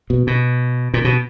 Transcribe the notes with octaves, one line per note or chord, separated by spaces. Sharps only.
B2
B2
A#2
B2